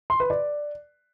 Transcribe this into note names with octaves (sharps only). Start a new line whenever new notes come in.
C6
B4
D5